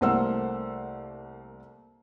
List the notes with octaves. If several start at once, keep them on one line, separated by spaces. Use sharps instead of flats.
C2 A3 A#3 C5 F#5 E6